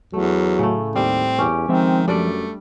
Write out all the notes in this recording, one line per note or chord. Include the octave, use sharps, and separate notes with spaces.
E2 F#3 A3
A2 C#3 A3
D#2 G3 C4
E2 C#4 G4
D#3 F3 G#3 C4 E5
F#2 G3 A3 D4 D5